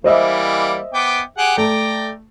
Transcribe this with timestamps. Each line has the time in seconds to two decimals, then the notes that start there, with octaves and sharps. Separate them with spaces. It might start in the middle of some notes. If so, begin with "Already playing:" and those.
0.04 E3 G3 A#3 C5 D#5 E5
0.94 B3 G5 D6
1.38 G4 G#4 F#5
1.58 A3 D5 G5 A#5